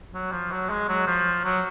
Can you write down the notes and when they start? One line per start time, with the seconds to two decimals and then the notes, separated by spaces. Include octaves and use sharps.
0.14 F#3
0.32 F3
0.51 F#3
0.70 G#3
0.89 F#3
1.07 F3
1.45 F#3